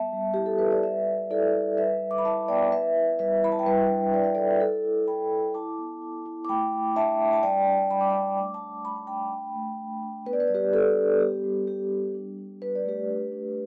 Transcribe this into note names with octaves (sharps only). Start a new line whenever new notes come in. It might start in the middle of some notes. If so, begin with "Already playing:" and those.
Already playing: G3 B3 E5 A5
G3
E4 G4
A4
G3 B4
D5
G3 B4 E5
G3
E4 A4 D5
G3
G3 B4 E5
G3
D6
B5
E4 E5 A5
B3 D5 G5
E4 B4 E5
E4
G3 B4 E5
E4 B5
A5
G5
G3 B4 E5
D4
G3 D5
E5
G3 A4 D5
E4 A4
E4
E4 G5 B5
E4
E4 A5 D6
B3
E4
E4
D6
A3 G5 B5
A3
D4 E5 A5
D4
A5
G3 D5 G5
D4
G3 B5
D6
D4 G5 B5
A3 D6
A5 D6
D4
A3 B5
A5
D4 G5 B5
D4
A3
D4
D4
B3 B4
D5
B4
G3 D5
G4 B4
D4 A4
G3
B3 G4
G3
B3 G4
G3
D4
D4
D4 B4
D5
A3 G4 B4
D4
D4